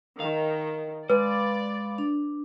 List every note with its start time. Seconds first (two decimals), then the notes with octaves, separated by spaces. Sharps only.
0.20 D#3 F5
1.10 G#3 B4 D5 F5 B5 D6
1.98 D4